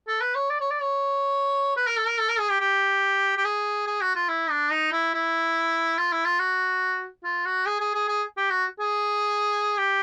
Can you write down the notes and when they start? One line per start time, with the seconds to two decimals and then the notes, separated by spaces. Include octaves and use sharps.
0.08 A4
0.21 B4
0.35 C#5
0.50 D5
0.61 C#5
0.71 D5
0.82 C#5
1.77 B4
1.87 A#4
1.97 A4
2.07 A#4
2.19 A4
2.29 A#4
2.39 G#4
2.50 G4
2.60 G4
3.37 G4
3.45 G#4
3.87 G#4
4.01 F#4
4.15 F4
4.29 E4
4.51 D4
4.72 D#4
4.92 E4
5.14 E4
5.99 F4
6.12 E4
6.25 F4
6.40 F#4
7.24 F4
7.46 F#4
7.66 G#4
7.80 G#4
7.94 G#4
8.08 G#4
8.37 G4
8.51 F#4
8.80 G#4
9.78 G4